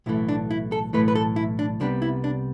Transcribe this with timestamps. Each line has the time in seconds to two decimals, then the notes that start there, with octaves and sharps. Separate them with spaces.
0.06 B1 A2 E3 A3 E4
0.29 D4
0.51 E4
0.72 A4
0.93 B1 A2 E3 A3 B4
1.08 B4
1.15 A4
1.36 E4
1.59 D4
1.80 C2 C3 G3 B3 D4
2.02 E4
2.24 D4